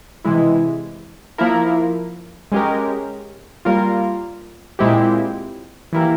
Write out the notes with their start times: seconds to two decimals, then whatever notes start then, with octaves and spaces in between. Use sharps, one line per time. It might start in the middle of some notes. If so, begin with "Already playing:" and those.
0.25 C3 E3 G#3 E4
1.38 F3 A#3 E4 A#4
2.52 G#3 C#4 G4 A#4
3.65 G3 A#3 F4 A#4
4.79 A#2 G#3 C4 E4 G4
5.93 E3 A#3 E4 G4 A#4